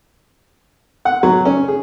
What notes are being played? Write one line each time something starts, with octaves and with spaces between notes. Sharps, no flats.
F#5
F#3
C#4
G#4